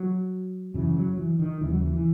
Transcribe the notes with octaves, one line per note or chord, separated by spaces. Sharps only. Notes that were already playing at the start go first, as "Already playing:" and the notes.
Already playing: F#3
F#2 C#3 E3
F#3
E3
D#3
D#2 C#3 E3
F#3
E3
E3